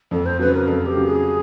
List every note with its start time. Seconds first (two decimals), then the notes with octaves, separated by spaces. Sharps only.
0.11 F2 A4
0.26 C5
0.39 C#3 F#3 B4
0.54 A#4
0.67 F2 A4
0.86 G4
0.96 C#3 F#3
1.06 G#4